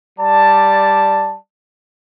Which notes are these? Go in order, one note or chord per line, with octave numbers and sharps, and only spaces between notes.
G3 D5 A5